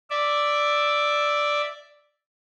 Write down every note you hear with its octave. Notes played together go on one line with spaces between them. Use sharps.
D5 E5